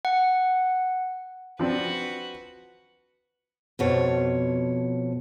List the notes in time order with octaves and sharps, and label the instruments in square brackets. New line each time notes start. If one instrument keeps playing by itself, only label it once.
[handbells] F#5
[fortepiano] F3 C4 D4 [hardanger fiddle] F#4 B4
[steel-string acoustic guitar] F2 B2 C#5